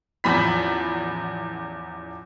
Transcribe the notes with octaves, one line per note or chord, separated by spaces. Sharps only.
A1 E2 F3 B5 B6